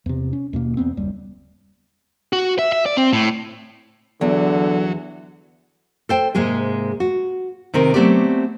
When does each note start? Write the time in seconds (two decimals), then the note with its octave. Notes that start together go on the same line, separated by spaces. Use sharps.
0.06 E2 C3
0.33 C#4
0.53 D#2 B2 A#3
0.77 E2 B3 C4
0.97 F#1 D#2 G3
2.33 F#4
2.59 E5
2.72 E5
2.86 D5
2.97 C4
3.13 A2
4.21 E2 D3 F#3
6.09 A4 C5 G5
6.35 G#2 C3 G#3 A#3 G#4
7.00 F#4
7.74 C3 D#3 C4 A#4
7.94 F#3 A3 B3 C4 G4 D5